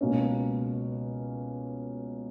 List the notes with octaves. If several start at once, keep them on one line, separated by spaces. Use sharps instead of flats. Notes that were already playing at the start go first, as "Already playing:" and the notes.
C#2 B2 A#3 C#4